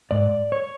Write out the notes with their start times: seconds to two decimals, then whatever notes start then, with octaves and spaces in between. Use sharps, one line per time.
0.11 G#2 D5
0.52 C#5